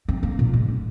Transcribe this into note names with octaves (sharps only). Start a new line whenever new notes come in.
C4
A#3
A#2
G#2